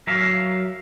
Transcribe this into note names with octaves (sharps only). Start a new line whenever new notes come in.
F#3 A#4 E5 F5